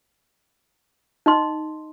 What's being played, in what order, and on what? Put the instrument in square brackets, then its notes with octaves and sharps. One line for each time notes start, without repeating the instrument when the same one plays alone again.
[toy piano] D#4 D#5 C6